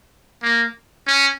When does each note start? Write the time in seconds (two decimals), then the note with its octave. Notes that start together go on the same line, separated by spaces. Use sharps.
0.43 A#3
1.07 C#4